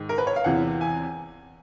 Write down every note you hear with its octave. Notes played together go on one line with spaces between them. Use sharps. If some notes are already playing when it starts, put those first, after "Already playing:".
Already playing: G#2 D#3
A#4
B4
C#5
F5
E2 C3 E3 F#5
G#5